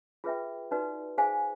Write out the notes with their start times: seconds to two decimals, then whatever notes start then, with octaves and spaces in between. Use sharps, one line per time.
0.24 F4 G#4 B4 E5 G5
0.71 D#4 F#4 B4 D5
1.18 G#4 C5 F5 G#5